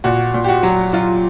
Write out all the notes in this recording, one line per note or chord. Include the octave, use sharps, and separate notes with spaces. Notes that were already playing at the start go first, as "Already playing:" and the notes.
A#2 F#4
A#2
G4
F#4
F#3
F#3 F4